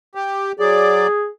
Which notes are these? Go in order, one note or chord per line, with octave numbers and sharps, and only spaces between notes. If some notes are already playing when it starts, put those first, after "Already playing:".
G4
F#3 G#4 D5